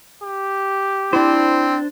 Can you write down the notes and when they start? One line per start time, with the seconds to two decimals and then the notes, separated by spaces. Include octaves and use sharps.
0.23 G4
1.13 C4 D4 E4 C5